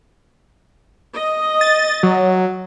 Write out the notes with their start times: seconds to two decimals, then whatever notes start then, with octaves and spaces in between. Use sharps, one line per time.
1.16 D#5
1.61 A6
2.03 F#3